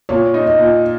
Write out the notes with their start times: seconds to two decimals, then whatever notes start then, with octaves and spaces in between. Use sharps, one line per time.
0.09 A#2 C#5
0.34 D#4
0.47 D#5
0.59 A#2